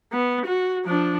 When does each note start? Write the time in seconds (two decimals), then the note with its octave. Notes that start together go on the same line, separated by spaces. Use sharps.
0.12 B3
0.46 F#4
0.86 F3 D4